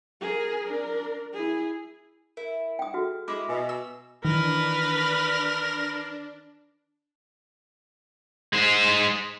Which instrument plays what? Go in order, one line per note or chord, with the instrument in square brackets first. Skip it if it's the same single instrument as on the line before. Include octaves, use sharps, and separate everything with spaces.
[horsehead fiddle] G#4 A#4
D4 A#4
E4 G#4
[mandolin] E4 [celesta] A#4
[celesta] F#5 [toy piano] G5 D#6
[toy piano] F#4 [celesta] G#4 A4 F6
[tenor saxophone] G#3 [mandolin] E4 [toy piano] D6
[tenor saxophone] B2 [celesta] D#5 G#5
[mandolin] E6
[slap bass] D#3 E3 [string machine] D4 [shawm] A#4 [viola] B4
[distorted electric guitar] G#3 C5